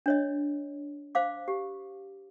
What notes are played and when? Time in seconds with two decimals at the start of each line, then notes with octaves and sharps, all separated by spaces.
0.06 D4 C#5 D#5
1.15 C5 F5 D6
1.48 G4